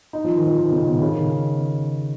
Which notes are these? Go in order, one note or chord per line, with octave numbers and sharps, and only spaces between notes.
D#4
F3
D#3
F3
D#3
C#3
B2
C#3
D#3